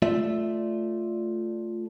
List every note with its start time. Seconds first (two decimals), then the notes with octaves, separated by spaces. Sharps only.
0.02 A3 F4 D5 E5